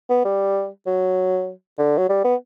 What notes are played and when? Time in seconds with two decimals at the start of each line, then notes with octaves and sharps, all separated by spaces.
0.10 B3
0.25 G3
0.86 F#3
1.78 D3
1.98 F#3
2.09 G3
2.24 B3